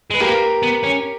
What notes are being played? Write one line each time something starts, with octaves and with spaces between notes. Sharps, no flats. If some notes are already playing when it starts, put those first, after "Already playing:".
G#3 B4
A#3 G4 A#4
B3
C#4